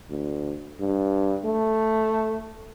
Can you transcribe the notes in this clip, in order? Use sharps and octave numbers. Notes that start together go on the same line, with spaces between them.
D2
G2
A3